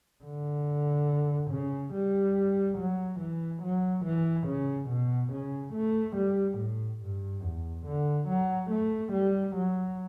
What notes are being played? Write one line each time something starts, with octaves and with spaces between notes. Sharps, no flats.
D3
C#3
G3
F#3
E3
F#3
E3
C#3
B2
C#3
A3
G3
A2
G2
E2
D3
F#3
A3
G3
F#3